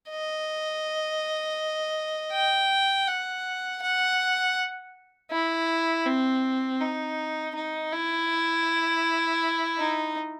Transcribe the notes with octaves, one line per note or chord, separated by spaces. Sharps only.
D#5
G5
F#5
F#5
E4
C4
D#4
D#4
E4
D#4